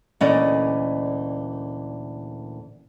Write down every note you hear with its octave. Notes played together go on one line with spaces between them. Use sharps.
D2 A#2 E3 C#4 D5 D#5